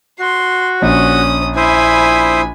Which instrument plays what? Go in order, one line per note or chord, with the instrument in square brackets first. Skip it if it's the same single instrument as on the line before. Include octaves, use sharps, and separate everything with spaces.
[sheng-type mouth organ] F#4 [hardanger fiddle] C6
[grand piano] A#1 [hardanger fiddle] C#4 D#6
[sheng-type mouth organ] E4 C5 D#6 [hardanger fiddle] G#5 B5